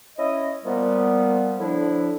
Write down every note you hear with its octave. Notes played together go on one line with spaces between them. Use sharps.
C#4 E4 D#5
A#2 F3 G3 B3
A2 D3 F3 D4 E4